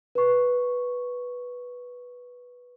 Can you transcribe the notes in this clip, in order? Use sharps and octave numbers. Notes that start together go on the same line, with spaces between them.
B4 C#6